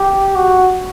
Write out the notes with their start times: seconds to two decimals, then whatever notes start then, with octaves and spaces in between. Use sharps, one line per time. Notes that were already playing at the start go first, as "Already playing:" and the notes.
Already playing: G4
0.35 F#4